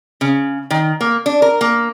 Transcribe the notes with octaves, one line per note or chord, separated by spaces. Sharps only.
C#3
D#3
A#3
D4
A#4
A#3